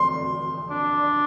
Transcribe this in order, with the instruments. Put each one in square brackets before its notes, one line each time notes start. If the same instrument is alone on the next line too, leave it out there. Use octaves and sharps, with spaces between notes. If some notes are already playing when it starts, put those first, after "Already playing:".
Already playing: [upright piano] C6
[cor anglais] D4